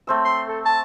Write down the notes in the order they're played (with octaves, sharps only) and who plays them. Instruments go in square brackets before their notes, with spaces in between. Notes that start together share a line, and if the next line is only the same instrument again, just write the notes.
[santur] A3 C4 E6
[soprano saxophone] C6
A4
A5